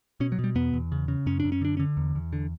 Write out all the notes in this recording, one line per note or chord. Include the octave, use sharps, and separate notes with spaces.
B2 C#4
F#3
B2
G3
E2 B3
E2
C#3
C#3
F#2 C#4
D4
F#2
C#4
D3 D4
C#4
D3
E2
E2
D3